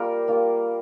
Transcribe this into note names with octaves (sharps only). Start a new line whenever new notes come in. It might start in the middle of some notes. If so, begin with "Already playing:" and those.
Already playing: G3 A#3 F4 G4 A#4 D5
G3 A#3 F4